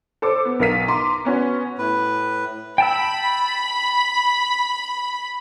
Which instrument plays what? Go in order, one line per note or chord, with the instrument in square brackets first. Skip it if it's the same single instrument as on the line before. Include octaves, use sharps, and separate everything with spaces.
[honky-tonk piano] A4 C5 D6
B3
B1 A#4 F5 B6 D#7
A#5 C6 D6
B3 C#4 F#4
[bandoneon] A2 B4
[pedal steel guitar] G5 A5 E6 [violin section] B5